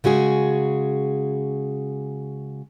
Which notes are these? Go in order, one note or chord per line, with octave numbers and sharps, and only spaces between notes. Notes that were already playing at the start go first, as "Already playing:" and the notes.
C#3 G#3 F#4 G#4